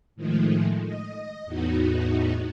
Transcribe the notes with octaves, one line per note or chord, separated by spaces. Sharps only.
A2 D#3 F3 G#3 A3
D#5
E2 A2 B3 D#4 F#4